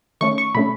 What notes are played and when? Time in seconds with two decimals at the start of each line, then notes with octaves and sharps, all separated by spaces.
0.21 D#3 A3 C#4 C#6
0.38 C#6
0.55 B2 A3 C#4 B5